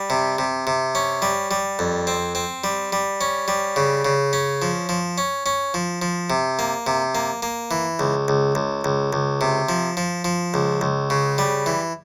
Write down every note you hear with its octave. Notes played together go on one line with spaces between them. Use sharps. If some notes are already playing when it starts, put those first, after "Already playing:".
Already playing: G3
C3
C3
C3
C#4
G3
G3
F2
C4
C4
G3
G3
C#4
G3
C#3
C#3
C#4
F3
F3
C#4
C#4
F3
F3
C3
A#3
C3
A#3
A#3
E3
C#2
C#2
C#2
C#2
C#2
C3
F3
F3
F3
C#2
C#2
C#3
G3
E3